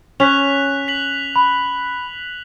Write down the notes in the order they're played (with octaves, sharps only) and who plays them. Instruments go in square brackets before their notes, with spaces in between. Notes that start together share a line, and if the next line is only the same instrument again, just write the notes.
[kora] C#4 [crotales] F#6 B6 F7
[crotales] B6 F#7
[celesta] B5